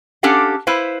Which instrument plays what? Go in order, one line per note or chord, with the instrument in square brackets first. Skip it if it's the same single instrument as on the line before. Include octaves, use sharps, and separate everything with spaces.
[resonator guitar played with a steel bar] C#4 D4 G4 A4 F5 F#5
E4 B4 C5 F5